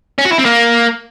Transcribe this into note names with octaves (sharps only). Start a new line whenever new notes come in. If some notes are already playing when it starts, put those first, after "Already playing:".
C#4
F#4
E4
C4
A#3